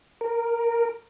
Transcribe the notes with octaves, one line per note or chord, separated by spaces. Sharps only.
A#4